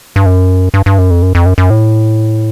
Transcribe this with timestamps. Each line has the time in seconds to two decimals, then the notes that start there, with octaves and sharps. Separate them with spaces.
0.16 G2
0.26 F#2
0.74 G2
0.86 G2
0.98 F#2
1.10 F2
1.22 F#2
1.35 F2
1.46 F#2
1.58 F#2
1.70 A2